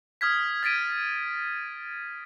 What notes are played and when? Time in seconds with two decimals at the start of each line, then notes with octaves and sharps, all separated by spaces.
0.21 D#6 F6 G#6 B6
0.63 G#6 A6 B6 D7 D#7